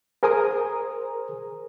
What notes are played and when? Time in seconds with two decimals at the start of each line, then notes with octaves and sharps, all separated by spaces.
0.23 G#4 A#4 C5 G#5 A#5 D#6